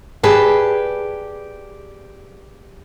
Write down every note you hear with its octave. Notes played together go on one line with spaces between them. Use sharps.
G4 G#4 B4 D5 A5